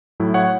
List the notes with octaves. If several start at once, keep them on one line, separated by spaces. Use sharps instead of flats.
A2 F#3 A3 E4
C#5 F#5